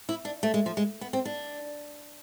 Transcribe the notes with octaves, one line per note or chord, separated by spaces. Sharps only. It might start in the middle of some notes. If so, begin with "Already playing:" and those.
E4
D4
A3
G#3
F3
G#3
B3
C4
D4